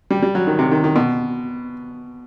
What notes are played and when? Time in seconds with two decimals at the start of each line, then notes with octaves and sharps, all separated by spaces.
0.10 G3
0.22 G3
0.35 F#3
0.47 D#3
0.59 C3
0.72 D#3
0.84 D#3
0.96 B2